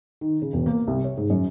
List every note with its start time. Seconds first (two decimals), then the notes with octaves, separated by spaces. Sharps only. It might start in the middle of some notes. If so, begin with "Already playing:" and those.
0.21 D#3
0.42 C#3
0.53 E1
0.66 A#3
0.87 C2
1.04 C#5
1.17 G#2
1.30 F#2